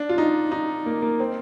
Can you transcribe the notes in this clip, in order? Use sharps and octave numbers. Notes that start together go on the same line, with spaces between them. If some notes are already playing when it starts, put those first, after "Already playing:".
Already playing: D4
F4
D#4
D#4
A#3
A#3
C4